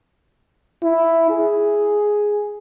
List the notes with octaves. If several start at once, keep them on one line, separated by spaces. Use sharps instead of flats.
E4
G#4